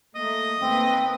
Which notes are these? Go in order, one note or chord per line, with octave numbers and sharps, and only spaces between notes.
A3 A#3 D#5
D#2 A#3 C4 B4